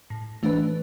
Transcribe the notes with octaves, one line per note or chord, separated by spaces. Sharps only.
A2
E3 A3 D4 B4